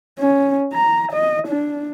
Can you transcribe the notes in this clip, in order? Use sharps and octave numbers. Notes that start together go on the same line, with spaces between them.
C#4
A#5
D#5
D4